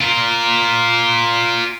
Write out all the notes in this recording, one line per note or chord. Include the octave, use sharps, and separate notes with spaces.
F4 A#4